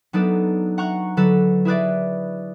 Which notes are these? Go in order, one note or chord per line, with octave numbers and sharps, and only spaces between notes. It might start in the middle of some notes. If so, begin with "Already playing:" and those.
F#3 B3 D4 D#4 A4 B4
F#5 A#5 C#6 F#6
D3 F#3 A4 B4
E4 G#4 B4 D5